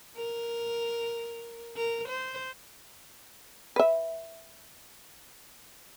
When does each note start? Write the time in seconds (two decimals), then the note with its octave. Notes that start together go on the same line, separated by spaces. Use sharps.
0.17 A#4
1.77 A#4
2.08 C5
3.76 B4 E5